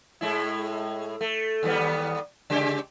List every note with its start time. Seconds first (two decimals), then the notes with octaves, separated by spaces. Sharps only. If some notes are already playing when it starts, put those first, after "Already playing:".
0.21 A2 G#3 E4
1.21 A3
1.63 D#2 G3 B3
2.50 C#3 G#3 G4